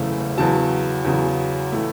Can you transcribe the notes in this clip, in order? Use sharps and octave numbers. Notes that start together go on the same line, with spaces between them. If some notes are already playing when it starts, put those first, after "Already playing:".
Already playing: F#1 E2 C#3 E3 A3
E2 C#3 F#3 A5
E2 C#3 F#3
A2 E3 A3